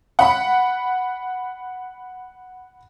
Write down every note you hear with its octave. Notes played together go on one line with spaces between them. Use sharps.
F#5 B5